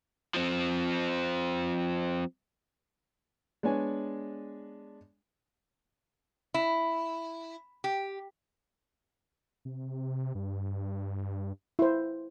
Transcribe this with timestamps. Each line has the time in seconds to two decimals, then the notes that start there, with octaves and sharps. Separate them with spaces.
0.34 F3 C4
3.63 G#3 B3 D4 C#5 G#5
6.54 E4
7.84 G4
9.65 C3
10.35 G2
11.79 E4 C5